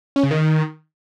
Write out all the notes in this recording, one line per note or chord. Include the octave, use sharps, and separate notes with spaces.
C#4
C#3
D#3